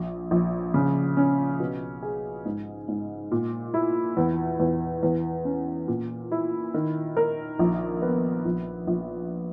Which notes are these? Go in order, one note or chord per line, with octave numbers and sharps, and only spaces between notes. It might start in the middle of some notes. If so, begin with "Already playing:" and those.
Already playing: A#1
A#1
C#3
C#4
B2
G#4
G#2
G#2
A#2
E4
E2
E2
E2
C#4
A#2
E4
D#3
A#4
A#1
B3
A#1
A#1